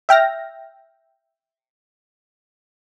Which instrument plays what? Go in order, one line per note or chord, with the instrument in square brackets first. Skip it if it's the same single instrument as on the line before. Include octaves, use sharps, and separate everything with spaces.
[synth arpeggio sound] E5 G5 F6 A#6